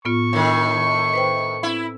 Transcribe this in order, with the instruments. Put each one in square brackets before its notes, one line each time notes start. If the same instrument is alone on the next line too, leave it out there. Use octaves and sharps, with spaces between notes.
[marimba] A2 B3 F4 [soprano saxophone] C#6
[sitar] A2 D#3 [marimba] D4 A#4
[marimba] B4 C5 G5
[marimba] C4 [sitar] E4